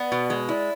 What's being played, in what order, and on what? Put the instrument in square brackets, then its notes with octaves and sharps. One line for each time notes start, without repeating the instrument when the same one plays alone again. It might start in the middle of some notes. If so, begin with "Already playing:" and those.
Already playing: [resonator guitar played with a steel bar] B3 [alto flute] D5
[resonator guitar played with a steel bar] B2
G#3
[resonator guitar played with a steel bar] E4 [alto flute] D5